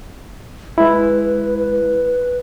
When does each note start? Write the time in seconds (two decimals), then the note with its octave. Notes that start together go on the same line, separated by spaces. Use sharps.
0.78 G#3 E4 B4
1.57 B4